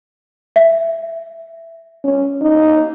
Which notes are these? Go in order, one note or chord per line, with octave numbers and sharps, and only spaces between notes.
E5
C#4
D#4